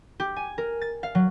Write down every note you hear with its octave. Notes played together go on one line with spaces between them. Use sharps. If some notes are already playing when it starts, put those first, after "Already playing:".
G4
G#5
A#4
A6
F5
F#3